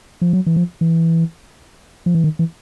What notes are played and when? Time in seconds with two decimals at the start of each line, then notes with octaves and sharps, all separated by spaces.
0.22 F3
0.33 F#3
0.46 E3
0.56 F3
0.81 E3
2.06 F3
2.15 E3
2.24 D#3
2.39 E3